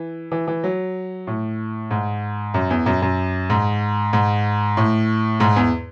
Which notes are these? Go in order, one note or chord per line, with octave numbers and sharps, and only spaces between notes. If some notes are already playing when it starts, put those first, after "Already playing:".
Already playing: E3
E3
E3
F#3
A2
G#2
F#2
E2
F#2
F#2
G#2
G#2
A2
G#2
E2